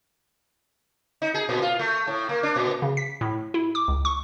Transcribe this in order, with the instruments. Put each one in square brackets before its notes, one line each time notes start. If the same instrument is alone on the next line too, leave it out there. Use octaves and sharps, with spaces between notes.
[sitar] D#4
G#4
A#2
F4
A3
A2
A#3
D4
A#2
[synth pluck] C#3
B6
A2
E4
D6
C#2
C#6